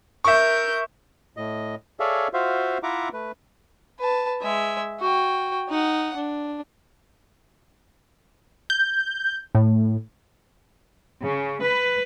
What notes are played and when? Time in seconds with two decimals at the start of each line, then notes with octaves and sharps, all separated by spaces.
0.25 A#4 E5 C#6 G6
1.37 A2 D#5
2.00 G#4 A4 C#5 D5 E5 F5
2.34 F4 F#4 C5 E5 F5
2.83 E4 F4 E5 F#5 A#5 D6
3.13 A3 B4
4.00 B4 A5
4.41 G#3 E5
5.00 F#4 G5
5.70 D#4 F#5
6.16 D4
8.70 G6
9.55 A2
11.22 C#3
11.62 B4